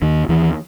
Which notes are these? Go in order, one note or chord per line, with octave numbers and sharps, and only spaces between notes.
D#2 D#3
D#2 E3